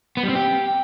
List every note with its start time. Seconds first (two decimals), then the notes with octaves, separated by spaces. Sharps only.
0.17 B3
0.23 G3
0.29 C4
0.35 G4